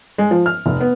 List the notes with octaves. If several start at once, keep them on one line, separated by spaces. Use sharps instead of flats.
G#3
F3
F6
F1
B3